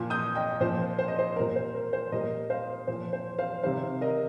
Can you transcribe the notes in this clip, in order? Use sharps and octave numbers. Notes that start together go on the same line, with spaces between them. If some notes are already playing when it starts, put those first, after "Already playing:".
Already playing: A#2 F3
D#6 G6
D#5 G5
A#2 F3 C5
C5
D#5
C5
A#2 G3 A#4
C5
A#4
C5
A#2 G3 A#4 D#5
C5 F5
A#2 F3 C5
C5
C5 F5
C3 D#3 G3 C5 F5
A#4 D#5